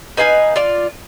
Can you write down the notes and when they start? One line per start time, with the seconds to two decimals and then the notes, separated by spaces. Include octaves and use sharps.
0.17 D#4 B4 F5 G#5
0.56 F4 D5